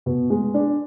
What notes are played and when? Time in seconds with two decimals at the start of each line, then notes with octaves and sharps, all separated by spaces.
0.06 B2
0.30 G#3
0.54 D4